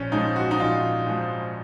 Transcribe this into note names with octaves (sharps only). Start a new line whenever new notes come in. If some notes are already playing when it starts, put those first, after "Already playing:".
Already playing: A#1 C#4
G#2 F3 D#4
F#4
D#4
A#1 F4
G#2 F3